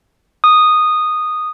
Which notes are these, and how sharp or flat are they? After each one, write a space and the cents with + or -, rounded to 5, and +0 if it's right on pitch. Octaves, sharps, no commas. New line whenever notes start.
D#6 -10